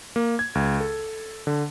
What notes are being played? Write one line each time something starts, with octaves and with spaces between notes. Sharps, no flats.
A#3
G#6
C#2
A4
D3